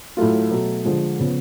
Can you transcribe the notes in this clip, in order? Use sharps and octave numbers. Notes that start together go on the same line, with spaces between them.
A2 F#3 A3 F4
B2 F#3 A3
D3 F3 G#3
C#3 F3 B3